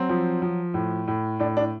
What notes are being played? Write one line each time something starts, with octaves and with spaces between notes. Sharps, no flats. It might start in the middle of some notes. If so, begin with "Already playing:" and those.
Already playing: F#3 C4
F3
F3
A2
A2
A2 D4
D4